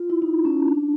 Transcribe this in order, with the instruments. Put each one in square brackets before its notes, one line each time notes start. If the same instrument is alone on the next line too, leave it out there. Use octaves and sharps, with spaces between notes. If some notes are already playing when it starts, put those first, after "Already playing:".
Already playing: [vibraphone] F4
E4
D#4
C#4
D4